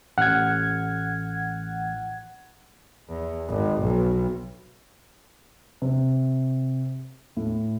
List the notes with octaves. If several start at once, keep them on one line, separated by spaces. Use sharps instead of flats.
A1 F#5 F6 G#6
E2
G#1
B1
C3
A2